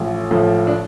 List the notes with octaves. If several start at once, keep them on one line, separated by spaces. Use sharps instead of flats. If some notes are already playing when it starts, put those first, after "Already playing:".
Already playing: A1 A2 F3
A2 F3
D4